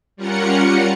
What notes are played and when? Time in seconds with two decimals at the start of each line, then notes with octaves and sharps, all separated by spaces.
0.17 G3 C#4 F4 A#4 F#5 C#7